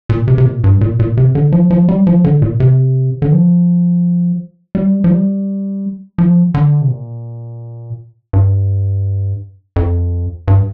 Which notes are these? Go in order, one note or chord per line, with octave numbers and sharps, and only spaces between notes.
A#2
C3
C3
A#2
G2
A#2
A#2
C3
D3
F3
F3
G3
F3
D3
A#2
C3
D3
F3
G3
F3
G3
F3
D3
C3
A#2
G2
F2
G2